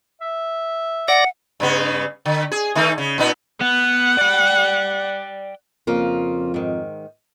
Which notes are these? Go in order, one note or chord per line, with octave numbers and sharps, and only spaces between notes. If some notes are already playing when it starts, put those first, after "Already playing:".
E5
D5 F#5 A#6
G2 C#3 B3
D3
G#4
D#3 A3 D#4
C#3
A#2 B3 D#4
B3 F#5
D5 G5
F2 C#3 A#3 F4
G#2 D#3